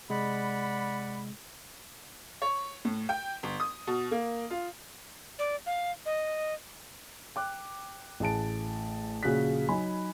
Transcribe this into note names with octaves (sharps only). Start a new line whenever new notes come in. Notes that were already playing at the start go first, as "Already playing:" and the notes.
C3 G#3 D5 F#5 B5
C#5
A2
G5
G1
D#6
B2
A#3
F4
D5
F5
D#5
G5 D6 F#6
A1 G#4 A5 D7
A#1 C#3 F#4 G#4 F#6 B6
F#3 D#4 G#5 B5